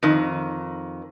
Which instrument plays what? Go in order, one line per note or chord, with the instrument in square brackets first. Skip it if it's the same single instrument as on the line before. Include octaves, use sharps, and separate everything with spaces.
[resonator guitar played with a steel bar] F2 D#3